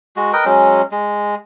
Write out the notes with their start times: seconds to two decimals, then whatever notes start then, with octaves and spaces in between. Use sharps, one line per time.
0.16 G#3 F#4
0.33 A#4 B4 D#5 G5
0.45 F#3 G#3 C#4
0.92 G#3